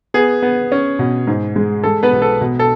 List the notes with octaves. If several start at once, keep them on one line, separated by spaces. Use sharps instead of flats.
B3 G#4
B3
C#4
B2
G#2
G#3
G#3 A4
B3 B4
B1
A4
B2
A4